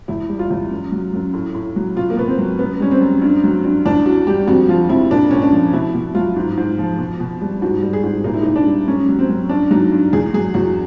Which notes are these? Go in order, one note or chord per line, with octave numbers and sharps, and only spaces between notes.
E2 E4
G3
F4
E2
F#2
F#3
F#2
A2
A2
F#3
B2 F4
A#3
B2 B3
C4
F#3
F#2 B3
G3 C#4
C4
F#2
G2
F#3
G2
E2 D4
E3 F#4
G3 G4
F2 F#4
F3 F4
F2 E4
A#2 D4
A#2 C#4
D4
F3
B2 E4
B2
F#3 F4
G#2
G#2
F3
B2
B2
G3
G#2 F#4
G3
G#4
G#2
A#2 D#4
E4
A#2 D#4
D4
G3
F#2 C#4
F#3
C4
F#2
G2 D4
F#3 D#4
G2
E2 G#4
F#3 G#4
E2 F#4